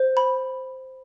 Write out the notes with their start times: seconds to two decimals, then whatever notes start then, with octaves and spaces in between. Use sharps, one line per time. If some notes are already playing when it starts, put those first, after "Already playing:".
Already playing: C5
0.17 B5